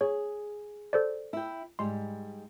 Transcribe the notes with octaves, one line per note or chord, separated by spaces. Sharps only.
G#4 C#5
A4 C5 D5
E4 G5
G#2 G3 C6